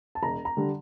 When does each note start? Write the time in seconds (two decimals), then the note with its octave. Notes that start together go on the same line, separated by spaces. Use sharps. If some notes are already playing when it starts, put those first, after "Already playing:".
0.15 A5
0.22 E1 A#5
0.45 A#5
0.57 D3 G3